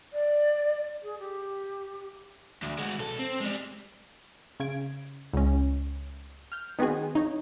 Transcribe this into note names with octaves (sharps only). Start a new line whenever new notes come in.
D5
G#4
G4
D2
G#3 F#4
B1 A4
C4
G3 G#3
C#3 G#6 D7
C#2 C#4
F6 G6
D#3 B3 C4 F#4 G#4
D#4 C#5